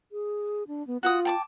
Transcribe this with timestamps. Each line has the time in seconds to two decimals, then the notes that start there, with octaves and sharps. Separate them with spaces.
0.12 G#4
0.68 D4
0.87 B3
1.03 F4 F#4 F#5 D#6
1.25 G5 A5 D6